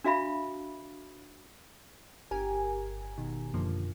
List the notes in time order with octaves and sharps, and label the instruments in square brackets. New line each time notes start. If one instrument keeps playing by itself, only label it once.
[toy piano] D4 F#4 E5 F5 B5
[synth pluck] G1 G4 A#4 G#5
B2 D#3
F#2 D3 F3 A#3